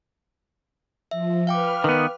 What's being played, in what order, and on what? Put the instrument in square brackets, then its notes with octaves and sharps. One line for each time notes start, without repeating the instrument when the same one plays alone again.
[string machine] F3 [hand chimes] E5
[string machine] B4 F6 [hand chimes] F5 G5 D6
[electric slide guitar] D#3 B3